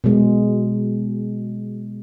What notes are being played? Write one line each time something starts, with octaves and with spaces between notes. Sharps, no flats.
B2 G#3